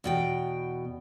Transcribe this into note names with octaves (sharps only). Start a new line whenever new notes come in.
E2 B2 G5